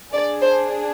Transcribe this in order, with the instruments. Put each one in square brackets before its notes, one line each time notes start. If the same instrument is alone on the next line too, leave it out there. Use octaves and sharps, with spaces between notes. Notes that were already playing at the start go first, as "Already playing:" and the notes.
[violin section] D4 G#4 D5
C5